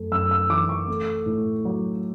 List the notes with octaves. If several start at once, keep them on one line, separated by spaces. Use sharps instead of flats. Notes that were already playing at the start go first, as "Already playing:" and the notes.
Already playing: F#2 A3
F#2 E6
E6
E3 D6
C#6
A3
A2
F#3